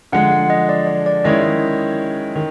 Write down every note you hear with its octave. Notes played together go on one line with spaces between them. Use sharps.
D3 F3 G#3 F#5
F#5
D#5
D5
D5
D5
D#3 G#3 C#4 E4 D#5
D#3